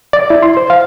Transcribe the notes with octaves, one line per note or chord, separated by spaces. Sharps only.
D5
E4
C6
C5
F5